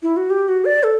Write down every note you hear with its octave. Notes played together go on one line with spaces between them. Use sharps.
E4
F#4
G4
F#4
D5
A4